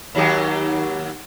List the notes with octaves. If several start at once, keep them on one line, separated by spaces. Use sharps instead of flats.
D#2 F#3 G4